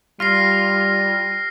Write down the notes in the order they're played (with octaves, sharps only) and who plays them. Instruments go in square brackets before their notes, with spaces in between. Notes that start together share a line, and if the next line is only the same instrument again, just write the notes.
[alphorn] G3 [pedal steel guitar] F4 [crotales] F6 A#6 C7